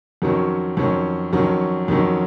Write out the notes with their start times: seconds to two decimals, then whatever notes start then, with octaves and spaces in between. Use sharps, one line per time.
0.22 F2 D#3 F#3 C#4
0.77 F2 D#3 F#3 C#4
1.33 F2 D#3 F#3 C#4
1.88 F2 D#3 F#3 C#4